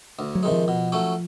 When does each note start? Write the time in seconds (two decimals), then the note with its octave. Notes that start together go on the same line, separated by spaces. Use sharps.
0.19 D2
0.35 F#3
0.43 C3 D#3 G#3
0.52 F3
0.68 B2
0.92 F#3 A3 C#4